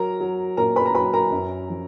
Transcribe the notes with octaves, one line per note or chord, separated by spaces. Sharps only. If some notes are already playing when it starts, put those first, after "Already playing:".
Already playing: F#3 A#4 A#5
F#3
A#2 A#4 A#5
B4 B5
A#5
F#3 B4 B5
A#4 A#5
F#2
F3